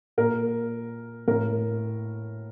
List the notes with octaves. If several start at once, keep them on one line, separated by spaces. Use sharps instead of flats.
A#2 A#4
A2 A#4